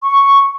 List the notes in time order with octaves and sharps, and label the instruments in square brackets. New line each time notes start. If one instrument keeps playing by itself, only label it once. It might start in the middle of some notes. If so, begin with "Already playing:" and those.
[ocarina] C#6